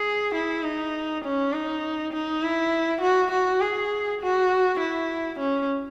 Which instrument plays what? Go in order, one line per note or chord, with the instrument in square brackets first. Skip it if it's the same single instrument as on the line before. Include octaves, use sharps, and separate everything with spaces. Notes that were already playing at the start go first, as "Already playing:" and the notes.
Already playing: [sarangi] G#4
E4
D#4
C#4
D#4
D#4
E4
F#4
F#4
G#4
F#4
E4
C#4